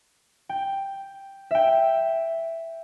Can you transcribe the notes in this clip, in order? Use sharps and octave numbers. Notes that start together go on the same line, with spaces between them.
G5
E5 G5